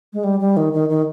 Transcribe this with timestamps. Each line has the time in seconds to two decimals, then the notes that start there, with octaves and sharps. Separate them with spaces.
0.13 G#3
0.24 G3
0.40 G3
0.57 D#3
0.73 D#3
0.89 D#3